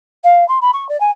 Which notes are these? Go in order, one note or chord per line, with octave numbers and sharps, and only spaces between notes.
F5
C6
B5
C#6
D5
G#5